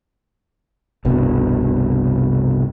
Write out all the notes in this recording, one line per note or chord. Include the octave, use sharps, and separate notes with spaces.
F1 C2 G2 B2